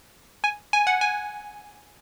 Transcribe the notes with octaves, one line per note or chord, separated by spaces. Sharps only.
G#5
G#5
F#5
G#5